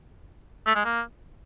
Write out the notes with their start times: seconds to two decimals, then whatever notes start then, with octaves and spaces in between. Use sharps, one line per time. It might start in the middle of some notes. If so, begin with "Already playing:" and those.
0.66 A3
0.76 G#3
0.85 A#3